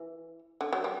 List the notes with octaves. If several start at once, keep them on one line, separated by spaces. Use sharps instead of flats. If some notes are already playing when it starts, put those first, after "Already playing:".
Already playing: E3
D3
F#3
G3